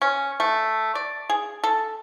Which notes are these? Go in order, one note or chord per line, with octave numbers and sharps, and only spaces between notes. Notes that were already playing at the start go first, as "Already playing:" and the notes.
C#4
A3
D5
G#4
A4